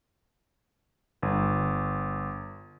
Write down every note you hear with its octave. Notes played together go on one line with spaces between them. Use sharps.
G1